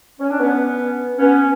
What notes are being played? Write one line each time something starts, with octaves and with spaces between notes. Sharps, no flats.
C#4
D4
B3 C#4
B3 C#4